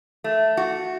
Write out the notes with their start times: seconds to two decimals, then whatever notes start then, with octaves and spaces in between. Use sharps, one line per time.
0.24 A3
0.57 F#4